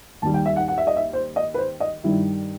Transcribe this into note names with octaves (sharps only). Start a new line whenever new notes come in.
D#2 D#3 G3 A5
G5
E5
F#5
F#5
E5
D#5
E5
C5
D#5
B4
C5
D#5
G2 D#3 G3 E4